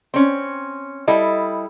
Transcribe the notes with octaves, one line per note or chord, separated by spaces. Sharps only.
C4 C#4
G3 E4 A4 D#5